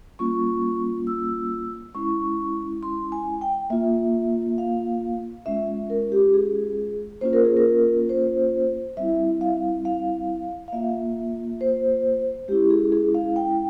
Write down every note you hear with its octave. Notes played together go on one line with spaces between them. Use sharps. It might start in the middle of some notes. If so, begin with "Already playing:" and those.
G3 A#3 C#4 F4 C#6
E6
G#3 C#4 E4 C#6
C6
G#5
G5
A#3 F4 E5
F5
G#3 C#4 F4 E5
A#4
G4
G#4
A#3 C#4 F4 C5
A#4
G#4
A#4
C5
G3 C4 E4 E5
F5
F5
F5
A#3 F4 E5
C5
G#3 C#4 E4 G4
G#4
G#4
F5
G5